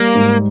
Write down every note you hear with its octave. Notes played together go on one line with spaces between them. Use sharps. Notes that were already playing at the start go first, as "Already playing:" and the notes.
Already playing: G3 A#3
G#2